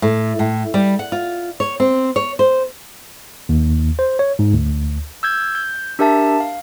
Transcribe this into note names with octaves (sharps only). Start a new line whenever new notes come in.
A2
A2
G3
F#5
F4
C#5
C4
C#5
C5
D#2
C5
C#5
G#2
D2
E6 G6 G#6
G6
D4 G4 A#4 E5 A5
F5